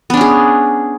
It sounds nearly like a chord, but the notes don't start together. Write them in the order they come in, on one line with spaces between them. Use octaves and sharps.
B3 D4 C#4 G#4